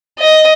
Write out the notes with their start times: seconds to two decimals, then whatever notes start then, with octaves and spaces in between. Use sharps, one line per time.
0.19 D#5